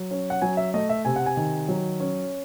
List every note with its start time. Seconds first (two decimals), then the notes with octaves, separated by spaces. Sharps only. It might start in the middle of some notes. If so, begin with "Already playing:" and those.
Already playing: F#3
0.11 C#4
0.30 F#5
0.42 F#3 G#5
0.57 E5
0.74 A3 D#5
0.89 E5
1.05 C3 G#5
1.16 F#5
1.26 G#5
1.37 D#3
1.68 F#3
2.00 C#4